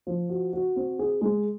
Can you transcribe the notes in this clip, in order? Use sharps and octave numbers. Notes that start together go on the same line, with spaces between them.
F3
F#4
F#4
C4
G#4
G#3